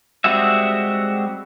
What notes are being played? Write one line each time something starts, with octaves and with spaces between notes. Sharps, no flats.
G3 G#3 C4 F#4 E5